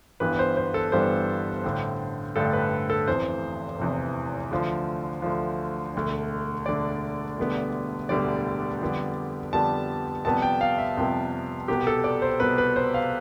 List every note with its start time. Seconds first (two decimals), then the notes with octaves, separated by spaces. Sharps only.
0.20 G1 G2 E3 G3 B3 B4
0.39 C5
0.57 C5
0.74 A4
0.92 G1 G2 E3 G3 B3 C5
1.64 A1 G2 D3 A3
2.36 A1 G2 D3 A3 A4
2.53 B4
2.90 A4
3.07 F1 E2 C3 E3 C5
3.79 F1 E2 C3 E3
4.51 D2 D3 F3
5.22 D2 D3 F3
5.95 E1 D2 D3
6.66 E1 D2 D3 D5
7.38 E1 D2 D3 G3 B3
8.09 E1 D2 D3 G3 B3 D5
8.81 F2 D3 G3 B3
9.53 F2 D3 G3 B3 A5
10.25 F2 C3 G3 B3 A5
10.42 G5
10.61 F5
10.78 E5
10.97 F2 C3 G3 B3
11.68 C2 B2 B3 G4
11.87 A4
12.04 D5
12.22 C5
12.40 C2 B2 B3 B4
12.58 B4
12.76 C5
12.94 F5